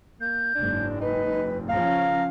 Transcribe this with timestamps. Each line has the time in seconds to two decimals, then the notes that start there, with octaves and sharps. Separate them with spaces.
0.20 A#3 G6
0.55 F#1 G#2 D4
1.01 D#4 B4
1.69 C#3 F3 C#4 F5 A#5